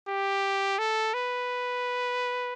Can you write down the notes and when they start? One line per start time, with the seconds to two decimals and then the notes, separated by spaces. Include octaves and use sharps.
0.08 G4
0.79 A4
1.14 B4